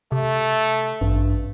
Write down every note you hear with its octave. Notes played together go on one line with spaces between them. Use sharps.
C3 A3
A1 G2